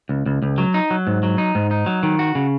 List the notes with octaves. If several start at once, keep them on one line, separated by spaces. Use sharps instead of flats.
C#2
C#2
C#2
F#3
D#4
F#3
G#2
F#3
D#4
G#2
D#4
F#3
D#3
F#4
C#3